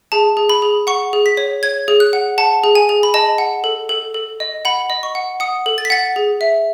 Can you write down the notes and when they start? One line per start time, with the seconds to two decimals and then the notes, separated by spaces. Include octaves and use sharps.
0.12 G#4 A5
0.37 G#4
0.49 B5
0.62 G#4
0.87 F#5 C#6
1.13 G#4
1.26 B6
1.37 C#5
1.63 C#5 G#6
1.88 G#4
2.00 F#6
2.13 F#5
2.38 F#5 A5
2.64 G#4
2.75 G#5
2.89 G#4
3.03 B5
3.14 D#5 A5
3.38 F#5
3.64 A4
3.89 A4
4.14 A4
4.40 D#5
4.65 F#5 B5
4.90 D#5
5.03 C#6
5.15 F#5
5.40 F#5 D#6
5.66 A4
5.78 A6
5.85 B6
5.90 F#5 A6
6.16 G#4
6.41 E5